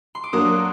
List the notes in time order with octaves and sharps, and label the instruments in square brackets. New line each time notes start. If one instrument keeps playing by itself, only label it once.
[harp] C6
D6
[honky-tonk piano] F#3 A#3 D4 [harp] D#6